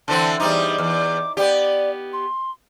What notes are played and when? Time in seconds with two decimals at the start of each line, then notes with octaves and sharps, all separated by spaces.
0.08 D3 E3 C4 A5
0.40 E2 G3 D#4 D6
0.78 E2
1.37 B3 G4 D5
2.13 C6